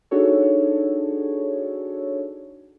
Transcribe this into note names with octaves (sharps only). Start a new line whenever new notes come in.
D4 D#4 F#4 G#4 A4 C#5